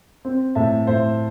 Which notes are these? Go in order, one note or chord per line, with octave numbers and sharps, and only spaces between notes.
C4
A2 E5 A5
A2 C5 E5